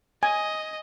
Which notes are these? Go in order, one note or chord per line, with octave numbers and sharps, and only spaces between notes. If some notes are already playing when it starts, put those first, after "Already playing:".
D#5 G#5